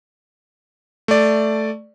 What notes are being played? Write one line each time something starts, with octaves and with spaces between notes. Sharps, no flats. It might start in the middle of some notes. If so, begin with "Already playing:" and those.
A3 D5